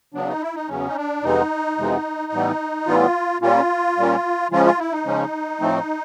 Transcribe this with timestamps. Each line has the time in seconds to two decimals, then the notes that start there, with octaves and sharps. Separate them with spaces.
0.14 E2 C#3 F#3 B3 D4
0.28 D#4
0.41 E4
0.55 D#4
0.68 E2 C#3 F#3 B3 C#4
0.88 D#4
0.96 D4
1.23 F2 C3 E3 G#3 B3 D#4
1.78 F2 C3 E3 G#3 B3
2.32 A2 E3 G3 B3
2.86 A2 E3 G3 B3 F4
3.41 A#2 G3 A#3 C#4 F4
3.97 A#2 G3 A#3 C#4
4.51 C#3 F3 G#3 C#4 F4
4.65 F4
4.79 E4
4.92 D#4
5.05 C#3 F3 G#3 C#4
5.60 A2 F3 A3 C4